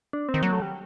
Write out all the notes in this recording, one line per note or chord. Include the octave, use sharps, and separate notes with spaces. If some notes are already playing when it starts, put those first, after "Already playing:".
D4
C4
D#3
F#3 A#3
A3
G3